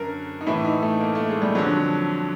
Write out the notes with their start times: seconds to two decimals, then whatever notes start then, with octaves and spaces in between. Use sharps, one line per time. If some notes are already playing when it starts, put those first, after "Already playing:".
Already playing: F#2 D3 A#4
0.41 D#4
0.46 A2 E3 E4
0.64 D#4
0.82 A3
1.01 A#3
1.15 A3
1.29 G#3
1.42 G3
1.55 F2 D3 F#3